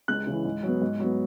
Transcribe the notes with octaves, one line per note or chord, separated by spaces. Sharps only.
C#2 F#6
C#3 E3
G#2
F#3 B3
G#2
F#3 B3